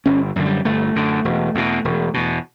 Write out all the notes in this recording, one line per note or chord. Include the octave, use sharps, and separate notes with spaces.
G1 C#4
F#2 D3
G3
G1 A3
F#2 D3
E1
E2 B2
E1
E2 B2